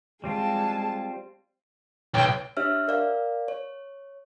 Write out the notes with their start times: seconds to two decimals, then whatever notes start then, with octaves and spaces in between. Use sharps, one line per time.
0.24 G3 G#3 C4 F4 A5
2.14 B1 G5
2.57 D4 G4 C#5 E5 E6 F6
2.88 A#4 D5 F5
3.48 C#5